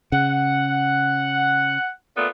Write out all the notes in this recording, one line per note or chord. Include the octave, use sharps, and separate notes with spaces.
C#3 F#5
A#2 A3 B3